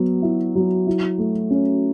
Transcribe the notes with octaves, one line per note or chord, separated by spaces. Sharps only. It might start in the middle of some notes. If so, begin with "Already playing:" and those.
Already playing: F#3 B3
E4
F#3
E4
A3
C#4